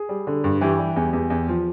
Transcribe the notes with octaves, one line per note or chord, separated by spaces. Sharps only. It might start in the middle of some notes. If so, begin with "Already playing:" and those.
Already playing: G#4
G3
D3
G2
E3 G4
G3
E2
E2
E2
F3